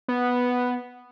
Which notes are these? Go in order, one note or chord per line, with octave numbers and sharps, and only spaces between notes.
B3